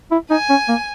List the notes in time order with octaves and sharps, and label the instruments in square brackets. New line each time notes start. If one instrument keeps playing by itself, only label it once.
[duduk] E4
[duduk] D#4 [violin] G#5
[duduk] C#4
A#3